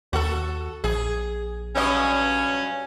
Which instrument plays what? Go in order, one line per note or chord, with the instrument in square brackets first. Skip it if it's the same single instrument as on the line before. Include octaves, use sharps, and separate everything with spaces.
[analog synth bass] D#2 [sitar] F#4 A4
[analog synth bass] A#1 [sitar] G#4
[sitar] G2 F#3 D#5 [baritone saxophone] C#4